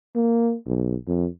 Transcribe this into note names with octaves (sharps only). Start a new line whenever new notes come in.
A#3
B1
F2